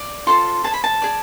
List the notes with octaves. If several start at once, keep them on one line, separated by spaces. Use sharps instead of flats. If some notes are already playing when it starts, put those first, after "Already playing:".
Already playing: D5
F4 A4 C5 C6
G#4 C5 A5
B5
A5
G#4 D5